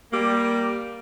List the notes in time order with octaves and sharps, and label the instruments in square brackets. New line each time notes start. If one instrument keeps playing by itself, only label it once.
[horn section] G3 A#3